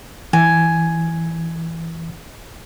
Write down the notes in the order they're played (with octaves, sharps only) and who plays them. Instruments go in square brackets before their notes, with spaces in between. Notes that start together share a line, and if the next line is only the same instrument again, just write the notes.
[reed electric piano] E3 [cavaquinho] G#5